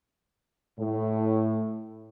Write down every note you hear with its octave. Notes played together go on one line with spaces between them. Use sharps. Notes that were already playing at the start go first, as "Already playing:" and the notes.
A2